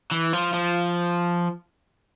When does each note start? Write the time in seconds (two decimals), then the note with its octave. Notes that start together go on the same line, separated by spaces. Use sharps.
0.11 E3
0.33 F3
0.53 F3